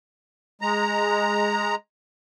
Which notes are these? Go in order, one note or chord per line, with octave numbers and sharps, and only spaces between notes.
G#3 A#5